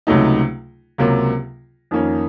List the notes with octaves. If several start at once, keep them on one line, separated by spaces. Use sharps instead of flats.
C#2 C3 F#3 A3 D#4
C#2 C3 F#3 A#3
F2 D#3 A#3 C#4